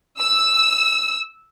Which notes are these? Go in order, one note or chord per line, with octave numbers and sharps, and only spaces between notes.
E6